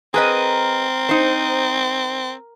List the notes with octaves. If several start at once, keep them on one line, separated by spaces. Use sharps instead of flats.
C4 G#4 A#4 B4 D#5
D#4 C5